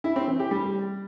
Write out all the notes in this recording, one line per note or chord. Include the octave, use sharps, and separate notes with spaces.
E4
C4
E3
G4
G3